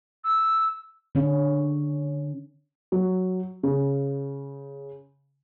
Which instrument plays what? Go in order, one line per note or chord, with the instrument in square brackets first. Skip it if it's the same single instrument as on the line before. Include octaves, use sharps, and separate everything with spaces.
[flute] E6
[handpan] D3 C#4
[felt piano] F#3
C#3